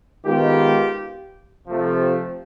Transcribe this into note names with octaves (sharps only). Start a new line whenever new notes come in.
D#3 G#3 B3 F4 G4
C3 F3 A3